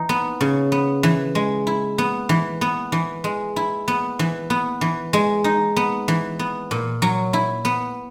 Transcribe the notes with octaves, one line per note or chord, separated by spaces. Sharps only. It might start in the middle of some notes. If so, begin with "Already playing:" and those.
Already playing: E3 D#4
B3
C#3
B3
E3
G#3
E4
B3
E3
B3
E3
G#3
E4
B3
E3
B3
E3
G#3
D#4
B3
E3
B3
A#2
F#3
E4
B3